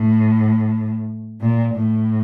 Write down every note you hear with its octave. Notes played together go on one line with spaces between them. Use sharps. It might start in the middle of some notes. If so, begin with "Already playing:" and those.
Already playing: A2
A#2
A2